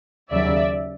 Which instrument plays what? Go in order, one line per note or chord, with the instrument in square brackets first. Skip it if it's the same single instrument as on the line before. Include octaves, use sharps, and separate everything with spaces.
[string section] D#2 C#3 F#3 D5 E5